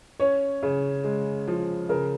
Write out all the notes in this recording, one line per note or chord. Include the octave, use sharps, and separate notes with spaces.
C#4 C#5
C#3
G#3
F3
C#3 A#4